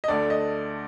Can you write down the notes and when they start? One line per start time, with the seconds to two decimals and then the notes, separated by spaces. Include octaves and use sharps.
0.04 D#5
0.08 D2 D3 A3 D4 D5
0.30 D#5